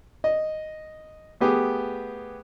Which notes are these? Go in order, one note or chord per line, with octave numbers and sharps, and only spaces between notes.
D#5
A3 B3 G4 G#4